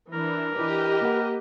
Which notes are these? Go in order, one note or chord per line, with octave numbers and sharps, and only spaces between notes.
E3 D4 A#4
E3 D4 G4 B4 D#5
A#3 F#5